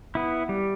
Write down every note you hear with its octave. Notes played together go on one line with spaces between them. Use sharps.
B3 E4
G3